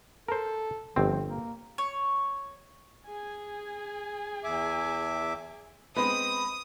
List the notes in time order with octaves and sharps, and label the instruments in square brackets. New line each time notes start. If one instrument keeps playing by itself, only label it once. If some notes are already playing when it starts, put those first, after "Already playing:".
[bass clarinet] A4 [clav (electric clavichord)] A#4 C5
[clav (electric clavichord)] G1 C4 [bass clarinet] F3
[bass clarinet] A#3
[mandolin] C#5
[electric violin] G#4 G#5
[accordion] E2 E5 D6
[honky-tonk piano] G#3 D#5 B5 [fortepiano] B3 C4 [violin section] D#6